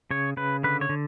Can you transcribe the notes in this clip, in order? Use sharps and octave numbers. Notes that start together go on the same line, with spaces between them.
C#3 C#5
C#3 B4
D3 B4
C#5
D3